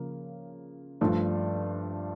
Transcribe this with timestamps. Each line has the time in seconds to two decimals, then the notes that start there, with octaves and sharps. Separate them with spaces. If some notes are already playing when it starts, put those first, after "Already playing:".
Already playing: C#3 F3 A#3
1.01 G2 F3 A3 D4